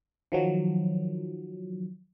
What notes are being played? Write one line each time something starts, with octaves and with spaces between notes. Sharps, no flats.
D#3 F3 F#3